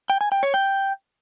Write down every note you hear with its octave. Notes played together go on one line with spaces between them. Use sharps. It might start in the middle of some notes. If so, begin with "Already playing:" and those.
G5
G#5
G5
C#5
G5